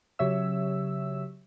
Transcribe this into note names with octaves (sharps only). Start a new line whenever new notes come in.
C#3 F#3 G4 C#5 E5 E6